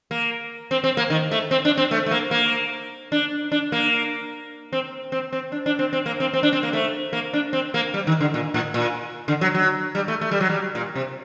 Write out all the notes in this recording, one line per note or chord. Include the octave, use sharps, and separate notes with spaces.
A#3
C4
C4
A#3
D#3
A3
C4
D4
C4
A3
A3
A#3
A#3
D4
D4
A#3
C4
C4
C4
D4
D4
C4
C4
A#3
C4
C4
D4
C4
A#3
A3
A#3
D4
C4
A#3
G3
D#3
D3
A#2
A2
A#2
D3
F#3
F#3
G3
A3
A3
G3
F#3
G3
A#2
C3